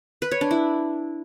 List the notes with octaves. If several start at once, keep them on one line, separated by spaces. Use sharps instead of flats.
B4
C#5
D4
E4